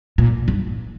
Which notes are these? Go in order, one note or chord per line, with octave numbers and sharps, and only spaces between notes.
A#2
G2